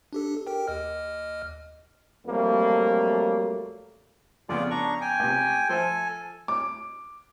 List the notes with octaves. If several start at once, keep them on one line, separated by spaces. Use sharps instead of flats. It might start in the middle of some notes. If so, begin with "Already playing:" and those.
D4 G4 A4
G4 A#4 G5
D#2 D#5 F6
F2 F#3 G3 A3 A#3
F2 C#3 B3 F4 D5
D4 A#5 C#6
G5 G#5
C#2 C3
F3 A4 C5 E5 G#5
D6